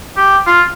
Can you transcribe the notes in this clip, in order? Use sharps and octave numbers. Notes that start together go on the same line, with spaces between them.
G4
F4